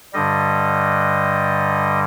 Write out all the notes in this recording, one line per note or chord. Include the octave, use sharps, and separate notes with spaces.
G2 D3 G3 D#5